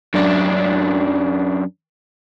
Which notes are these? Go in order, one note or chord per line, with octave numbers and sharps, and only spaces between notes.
F#2 D4